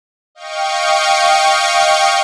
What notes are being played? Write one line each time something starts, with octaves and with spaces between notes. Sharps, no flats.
D#5 F5 G5 C#6